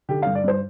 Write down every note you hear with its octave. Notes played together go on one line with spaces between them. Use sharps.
D3 G4
G2 F5
D5
G2 C5